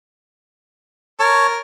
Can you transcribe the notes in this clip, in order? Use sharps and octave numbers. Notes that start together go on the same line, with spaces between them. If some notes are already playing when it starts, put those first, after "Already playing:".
A#4 C#5 A5 C#6